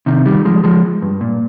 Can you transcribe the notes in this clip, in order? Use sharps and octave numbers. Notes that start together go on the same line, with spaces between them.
C3 D#3
D#3 G3
F3 G#3
F3 G#3
G2
A#2